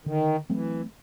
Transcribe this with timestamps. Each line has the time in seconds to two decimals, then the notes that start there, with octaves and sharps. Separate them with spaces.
0.06 D3 D#3
0.49 E3 F#3 A3 C4